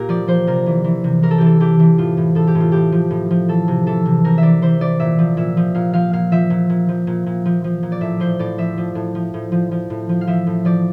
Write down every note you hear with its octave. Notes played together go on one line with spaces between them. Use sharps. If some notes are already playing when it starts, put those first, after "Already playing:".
Already playing: A#2 F4 G4 A#4
F3 D5
F3 C5
C3 A#4
E3
E3
C3
E3 A#4
A4
E3 G4
A4
E3 G4
E3
A2 F4
A2
A2 A4
G4
A2
F4
A2 G4
F3
A2
F3
E3 A4
C3
E3 A4
C3
C3 A#4
E5
E3 D5
E3 C5
E3 D5
A#2 E5
F3
A#2 E5
F3
A#2 F5
F3 F5
A#2 F5
F3 E5
A#2
A#2
F3
A#2
A#2
F3
F3
A#2
D5
A2 E5
F3 C5
A2 D5
F3 E5
F3
A2
F3
A2
F3
F3
A2
F3
F5
F3 E5
A2
F3 D5